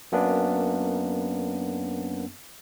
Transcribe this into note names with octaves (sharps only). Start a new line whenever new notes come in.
F#2 A#3 B3 D4